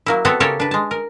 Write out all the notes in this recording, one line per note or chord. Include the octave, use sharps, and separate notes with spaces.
F#3 A#3 E4
B3 C4 F#4 A4 C#5 E5
C#3 G4 A4 A#4 C#5 A5
D4 B4
G#3 A5
A#4